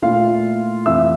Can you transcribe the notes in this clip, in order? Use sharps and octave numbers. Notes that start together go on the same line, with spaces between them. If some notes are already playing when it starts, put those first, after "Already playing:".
A#2 A3 E4 F4 F5
F2 C3 E3 A3 E5 E6